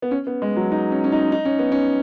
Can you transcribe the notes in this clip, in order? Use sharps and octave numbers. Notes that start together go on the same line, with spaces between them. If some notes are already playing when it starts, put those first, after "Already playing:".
B3
C#4
B3
G#3
F#3
D#4
C#4
C#4
D#4
D#4
C#4
B3
C#4